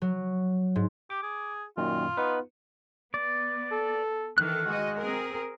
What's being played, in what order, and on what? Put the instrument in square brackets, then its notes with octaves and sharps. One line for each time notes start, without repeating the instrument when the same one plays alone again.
[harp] F#3
G#2
[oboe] G4 [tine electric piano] D6
[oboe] G#4
[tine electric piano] F#2 A#2 D#3 [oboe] F4
[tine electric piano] B3 D#4 B4
[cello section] B3 [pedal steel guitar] D5
[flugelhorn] A4
[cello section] D#3 E3 A4 [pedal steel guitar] F6 F#6
[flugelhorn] G#3 [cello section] F#4 D#5
[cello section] C4 G#4 A#4